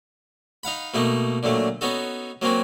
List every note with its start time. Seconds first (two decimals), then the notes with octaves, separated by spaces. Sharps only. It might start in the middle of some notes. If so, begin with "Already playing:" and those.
0.63 D#4 F5 F#5 B5
0.94 B2 A3 A#3 D#4
1.43 A#2 D3 F#3 A3
1.81 B3 C#4 D#4 F#4 A4
2.42 F#3 A#3 C4 C#4 F#4